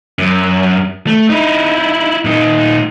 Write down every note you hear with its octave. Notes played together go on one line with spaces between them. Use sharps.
F#2
A3
D#4 E4
A#2 D#4